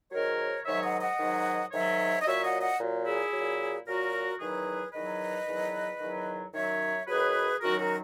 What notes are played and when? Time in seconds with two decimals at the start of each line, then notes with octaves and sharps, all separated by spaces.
0.11 G#2 D#3 F#3 A#4 C#5
0.65 G#2 D#3 F#3 C#5 E5
0.83 D#5 F#5
1.01 D#5 F#5
1.18 G#2 D#3 F#3
1.72 G#2 D#3 F#3 C#5 E5
2.22 D#5
2.26 A#2 F#3 C#5 E5
2.44 D#5 F#5
2.62 D#5 F#5
2.80 A#2 F#3
3.06 E4 G#4
3.33 A#2 F#3
3.86 A#2 F#3 F#4 A#4
4.40 E2 D#3 F#3 G#4 B4
4.93 E2 D#3 F#3 B4 D#5
5.47 E2 D#3 F#3
6.00 E2 D#3 F#3
6.54 F#2 D#3 F#3 C#5 E5
7.07 F#2 D#3 F#3 G#4 B4
7.61 F#2 D#3 F#3 F#4 A#4
7.79 F#4 A#4